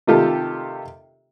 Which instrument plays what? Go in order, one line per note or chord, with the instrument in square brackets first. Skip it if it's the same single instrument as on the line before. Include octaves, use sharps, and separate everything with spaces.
[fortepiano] C3 D#3 F4 G4 A4